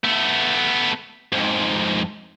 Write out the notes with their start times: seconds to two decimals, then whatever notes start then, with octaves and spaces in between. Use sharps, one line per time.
0.04 A3 B3
1.32 F2 G#2